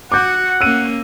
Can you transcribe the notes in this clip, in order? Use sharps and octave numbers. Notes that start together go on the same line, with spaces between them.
F#4 F#5 D6 G6
A#3 C#4 E6 D#7